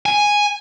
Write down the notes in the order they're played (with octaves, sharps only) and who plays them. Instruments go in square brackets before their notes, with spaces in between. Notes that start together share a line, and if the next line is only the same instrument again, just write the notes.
[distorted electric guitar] G#5